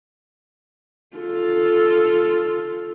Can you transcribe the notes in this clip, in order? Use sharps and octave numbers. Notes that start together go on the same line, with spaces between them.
F4 A4